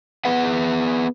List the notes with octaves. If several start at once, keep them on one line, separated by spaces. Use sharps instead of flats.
B3 G#4 B4 F#5